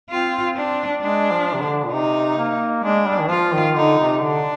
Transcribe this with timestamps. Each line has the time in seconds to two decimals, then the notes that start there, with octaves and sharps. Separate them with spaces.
0.10 C4 F4
0.56 D4
1.01 G#3 D4
1.31 F3
1.54 C3
1.62 D3
1.85 A#2
1.92 C3 D#4
2.38 A#3
2.84 G#3 D4
3.07 G3
3.20 D#3
3.30 F3 F4
3.53 D#3
3.76 D3 D#4
3.98 C3
4.21 D3 D4